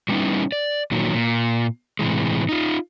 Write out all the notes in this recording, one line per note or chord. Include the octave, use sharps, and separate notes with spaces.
F#3 G3 B3 C#4 D#4 E4
D5
A#2 D#3 F#3
A#2
A2 C3 E3 G#3
D#4 F4